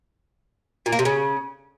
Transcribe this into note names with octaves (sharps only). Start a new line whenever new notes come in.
A#2
A#3
C3
C#3